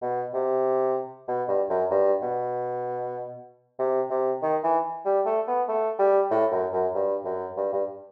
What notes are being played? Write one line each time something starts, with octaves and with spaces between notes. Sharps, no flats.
B2
C3
B2
G2
F#2
G2
B2
C3
C3
D#3
E3
G3
A3
B3
A3
G3
A2
F#2
F#2
G2
F#2
G2
G2